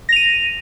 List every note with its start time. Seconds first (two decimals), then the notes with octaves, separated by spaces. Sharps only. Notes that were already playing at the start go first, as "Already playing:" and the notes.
0.09 A#6
0.12 F7
0.16 D#7